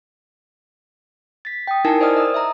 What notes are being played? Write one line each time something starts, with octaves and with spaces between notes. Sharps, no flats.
A6 B6
G5 D#6
D#4 E4 A#4 G#5 A5
C5 D5 D#5 D#6 F6
D#5 D#6 E6
E5 A#5